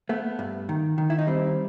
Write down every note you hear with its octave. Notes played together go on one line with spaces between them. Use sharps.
A3 B3
G2
D#3
D#3
E4
D#4
G3 C4